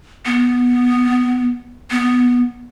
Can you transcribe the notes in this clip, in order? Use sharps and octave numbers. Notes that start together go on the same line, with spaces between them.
B3
B3